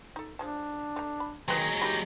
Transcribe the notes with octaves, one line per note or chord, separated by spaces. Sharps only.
D#4 A4
F3 G#3 D4 A5
A3 A#5
B5
D#3 F#3 G#3 C4 B4 D#5
D#3 G4 B5